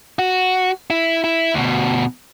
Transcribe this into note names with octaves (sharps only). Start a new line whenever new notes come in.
F#4
E4
E4
D2 B2